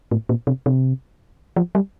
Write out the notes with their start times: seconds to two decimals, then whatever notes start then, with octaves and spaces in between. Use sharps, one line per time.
0.11 A2
0.29 A#2
0.47 C3
0.66 C3
1.56 F3
1.75 G3